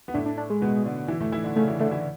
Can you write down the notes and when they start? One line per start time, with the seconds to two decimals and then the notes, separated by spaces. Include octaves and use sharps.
0.08 B3
0.14 A2 A3 D4
0.26 D4
0.38 D4
0.50 G#3
0.62 B2 B3
0.85 D3 D4
1.08 E3 E4
1.20 A2 A3
1.32 E3 E4
1.44 D3 D4
1.56 C#3 A3 C#4
1.68 E3 E4
1.79 D3 A3 D4
1.91 E3 E4